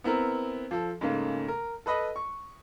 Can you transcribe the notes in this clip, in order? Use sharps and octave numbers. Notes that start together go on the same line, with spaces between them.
B3 C4 E4 A#4
F3 A4
G#2 C#3 A3 A#3
A#4
A4 B4 D#5 B5
C#6